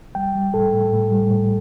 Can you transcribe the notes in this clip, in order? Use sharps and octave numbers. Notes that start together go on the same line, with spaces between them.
G3 G5
G3
A2 A4
A2
A2
G3
A2